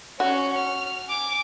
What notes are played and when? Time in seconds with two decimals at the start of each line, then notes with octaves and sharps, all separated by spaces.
0.20 C#4 F#4
0.57 F6
1.09 G#5 D6